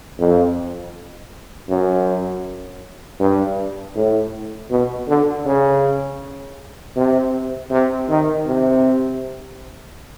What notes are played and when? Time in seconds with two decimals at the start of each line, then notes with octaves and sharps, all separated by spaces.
0.19 F2
1.69 F#2
3.20 G2
3.96 A2
4.70 B2
5.08 D3
5.46 C#3
6.96 C3
7.71 C3
8.09 D#3
8.47 C3